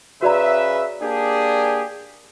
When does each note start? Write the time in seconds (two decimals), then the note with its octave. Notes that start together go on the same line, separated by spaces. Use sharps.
0.22 C#3 F#4 B4 D5 E5 A#5
1.02 A#3 D4 G4 G#4